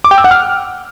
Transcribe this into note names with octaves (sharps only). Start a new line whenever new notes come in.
D6
G5
E6
F#5
F6